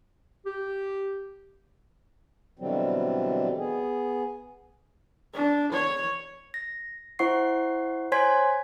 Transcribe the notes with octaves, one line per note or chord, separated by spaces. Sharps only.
G4
B2 D3 E3 F#3 G3 C4
B3 G#4
D4
C#5
A#6
E4 C5 F#5 C#6 C7
C5 C#5 G#5 C6 G#6 B6